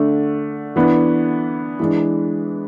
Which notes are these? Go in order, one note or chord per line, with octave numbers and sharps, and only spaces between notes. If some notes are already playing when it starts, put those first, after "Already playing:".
Already playing: D3 A3 D4
E3 B3 D4
E3 G#3 D4